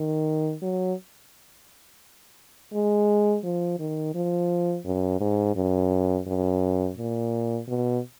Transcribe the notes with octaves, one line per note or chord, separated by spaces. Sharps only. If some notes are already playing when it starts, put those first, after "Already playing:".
Already playing: D#3
F#3
G#3
F3
D#3
F3
F#2
G#2
F#2
F#2
A#2
B2